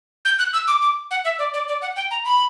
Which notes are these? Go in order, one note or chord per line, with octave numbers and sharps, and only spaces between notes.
G6
F#6
E6
D6
D6
F#5
E5
D5
D5
D5
F#5
G5
A#5
B5